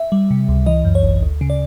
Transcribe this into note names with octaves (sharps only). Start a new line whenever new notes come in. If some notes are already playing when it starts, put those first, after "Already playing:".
Already playing: E5
G3
C3
C#2
E3 D#5
F#2
C#5
G#1
D2
C#3
D5